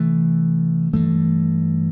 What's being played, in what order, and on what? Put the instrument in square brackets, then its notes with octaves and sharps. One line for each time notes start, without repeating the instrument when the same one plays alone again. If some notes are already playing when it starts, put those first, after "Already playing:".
Already playing: [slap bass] C3 E3 A3
G2 E3 A3